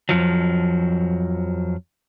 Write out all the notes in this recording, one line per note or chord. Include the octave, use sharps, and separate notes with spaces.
F2 F3 F#3